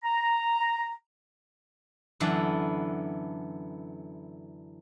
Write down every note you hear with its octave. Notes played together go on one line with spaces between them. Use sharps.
A#5
F#2 D3 E3 B3 A4 A5